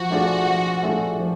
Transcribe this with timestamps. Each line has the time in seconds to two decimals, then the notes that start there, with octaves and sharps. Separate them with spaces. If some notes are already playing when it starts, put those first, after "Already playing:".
Already playing: F3 F#4
0.10 A3 D4 F4 G#4
0.47 F3
0.83 A3 D4 F4 G#4
1.19 F3